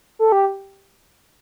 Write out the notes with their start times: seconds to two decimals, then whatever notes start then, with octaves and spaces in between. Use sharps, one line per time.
0.19 A4
0.32 G4